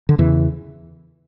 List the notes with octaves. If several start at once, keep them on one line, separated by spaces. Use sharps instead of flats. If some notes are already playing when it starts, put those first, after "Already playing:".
D3
E2 C#3 E3